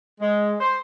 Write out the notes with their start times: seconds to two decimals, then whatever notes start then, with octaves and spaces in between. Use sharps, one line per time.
0.21 G#3
0.60 C5